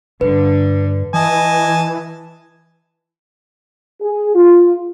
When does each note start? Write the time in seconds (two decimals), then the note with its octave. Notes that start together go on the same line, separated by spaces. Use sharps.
0.21 G2 D3 B4
1.14 E3 D#5 G#5 A5
4.01 G#4
4.35 F4